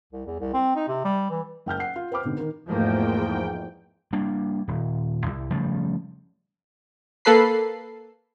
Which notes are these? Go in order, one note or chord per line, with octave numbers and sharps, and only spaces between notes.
C2
E2
C2
C4
D#4
C3
G3
E3
F#1 G5 F6 G6
F#5 C7
F4
B4 C5 G5 B5 D6 F6
G#2 B2 D3
D#3 A#4
E2 G#2 F3 A3 A#3 G5
G3 A#3 D4
D#1
C2
C#3 F3 G3 A3
A#3 A4 B4 B5 C7